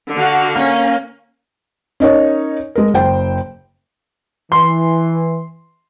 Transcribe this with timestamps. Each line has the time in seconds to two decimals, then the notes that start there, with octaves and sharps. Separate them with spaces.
0.14 D3 F#4 F5
0.56 A#3 C#4
2.00 C#4 D#4 A#4 C#5
2.75 G#3 A#4
2.94 F#1 C5 G5
4.52 E3 C6